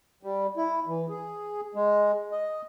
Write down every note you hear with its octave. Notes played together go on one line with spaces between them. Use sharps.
G3
E4
E3
G#4
G#3
D#5